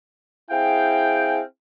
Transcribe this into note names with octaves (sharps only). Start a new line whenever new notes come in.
C4 E4 G#4 F5 G5